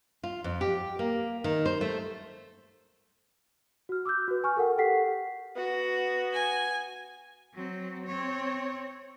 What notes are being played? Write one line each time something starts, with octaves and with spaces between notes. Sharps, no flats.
F4
F2
G4
A#3
D#3
C5
A3
F#4 F6
D6 E6 F#6 G6
F#4 B4
G#5 C#6 F6
A4 A#4 F#5 G5
G4 A4 F#5 B6 C7
B3 F#4
G#5
F#3 C4
C4 C#5